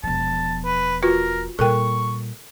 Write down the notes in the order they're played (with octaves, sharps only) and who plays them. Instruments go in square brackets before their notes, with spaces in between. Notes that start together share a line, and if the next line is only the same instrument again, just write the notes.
[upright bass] E1 F3 [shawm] A5
[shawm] B4
[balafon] F4 F#4 B4 [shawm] A#4
[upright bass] A#2 G3 [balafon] A4 A#4 G5 [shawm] C#6